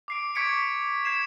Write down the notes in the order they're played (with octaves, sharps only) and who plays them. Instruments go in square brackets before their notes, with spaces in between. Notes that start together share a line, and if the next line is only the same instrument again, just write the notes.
[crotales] D6 C7 D7
C#6 D6 G#6 B6 C#7 D7
G#6 C7 E7